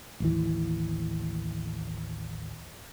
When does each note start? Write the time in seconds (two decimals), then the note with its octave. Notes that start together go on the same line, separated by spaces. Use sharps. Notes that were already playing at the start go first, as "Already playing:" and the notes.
0.20 A1 D#2 E3